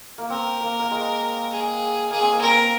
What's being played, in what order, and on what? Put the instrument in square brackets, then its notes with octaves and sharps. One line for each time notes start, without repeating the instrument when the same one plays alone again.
[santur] A#3
[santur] C4 [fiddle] A#4
[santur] A#3
A#3
G#3
[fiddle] G#4
[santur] A#3 [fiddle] G#4
[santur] C4
A#3
[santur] C4 [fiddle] A#4
[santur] A#3